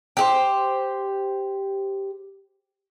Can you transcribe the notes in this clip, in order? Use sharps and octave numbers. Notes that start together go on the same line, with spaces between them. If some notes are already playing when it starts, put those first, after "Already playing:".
G4 G#4 C5